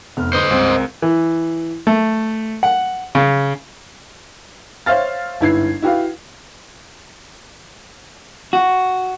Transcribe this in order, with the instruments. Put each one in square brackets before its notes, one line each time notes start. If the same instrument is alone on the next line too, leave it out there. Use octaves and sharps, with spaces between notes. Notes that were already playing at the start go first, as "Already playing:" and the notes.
[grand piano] F1 B3 F6
[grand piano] D3 C6 [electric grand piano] B4 [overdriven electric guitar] C5 D#5
[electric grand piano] C#2 C4 [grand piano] G2
[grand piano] A#4
[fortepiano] E3
A3
F#5
C#3
[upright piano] C5 C#5 E5 F5 F6 A6
G1 G#2 E4 B4 G#6 C7
E4 F#4 G4 B4 F5
[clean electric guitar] F#4